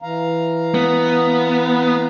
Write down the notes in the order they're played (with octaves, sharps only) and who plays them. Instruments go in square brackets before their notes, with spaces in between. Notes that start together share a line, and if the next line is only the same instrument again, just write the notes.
[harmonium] E3 F5 A#5
[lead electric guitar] B3